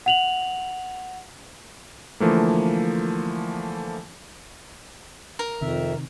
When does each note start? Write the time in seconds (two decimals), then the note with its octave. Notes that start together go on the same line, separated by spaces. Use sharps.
0.06 F#5 F7 F#7
2.20 D3 E3 F3 A3 A#3
5.39 A#4
5.61 F2 C3 D#3 E5